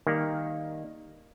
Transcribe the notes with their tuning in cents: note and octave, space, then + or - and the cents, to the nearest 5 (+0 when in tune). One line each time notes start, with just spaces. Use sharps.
D#3 +0 G3 +20 A#3 +0